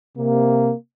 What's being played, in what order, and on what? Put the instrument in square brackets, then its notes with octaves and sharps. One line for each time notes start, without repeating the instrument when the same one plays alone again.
[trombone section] C3 A#3